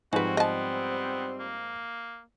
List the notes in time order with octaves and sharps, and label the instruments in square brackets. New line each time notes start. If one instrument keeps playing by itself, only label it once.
[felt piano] G#2 F3 G#5 [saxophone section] G3 C4 [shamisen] D#4 B4 [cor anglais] F#4
[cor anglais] B3 [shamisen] D#5 A5
[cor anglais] A#3